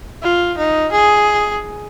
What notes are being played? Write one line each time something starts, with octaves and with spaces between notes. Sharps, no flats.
F4
D#4
G#4